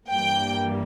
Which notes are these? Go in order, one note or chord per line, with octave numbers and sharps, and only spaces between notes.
G2 E3 G3 A#3 G5